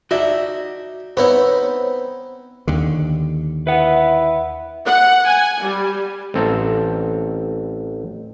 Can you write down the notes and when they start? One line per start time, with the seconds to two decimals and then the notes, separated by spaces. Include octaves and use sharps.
0.11 D#4 F#4 D5 E5
1.17 B3 C4 D#4 E4 C#5
2.67 D#2 D3
3.67 E4 B4 F#5
4.84 F#5
5.26 G#5
5.61 G3
6.34 A1 C4 A4 A#5